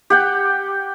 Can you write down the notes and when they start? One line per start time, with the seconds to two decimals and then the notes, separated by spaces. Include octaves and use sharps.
0.10 G4 F#5 G5